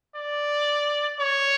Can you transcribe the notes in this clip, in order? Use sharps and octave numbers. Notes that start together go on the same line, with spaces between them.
D5
C#5